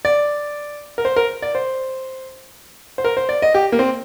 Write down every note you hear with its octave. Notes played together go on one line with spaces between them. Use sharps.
D5
A#4
C5
A#4
D5
C5
C5
A#4
C5
D5
D#5
G4
A#3
C4